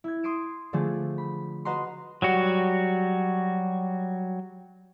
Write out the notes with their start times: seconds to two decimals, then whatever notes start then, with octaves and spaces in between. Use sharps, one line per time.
0.04 E4 G#6
0.23 C6 D#6 C7 D7 E7
0.73 D3 F3 A3 D4 G#4
1.18 B5
1.65 F#4 B4 D#5 F#5 A#5 C6
2.22 F#3 G3 F#4